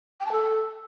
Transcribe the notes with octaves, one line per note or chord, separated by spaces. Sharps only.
G5
A5
A4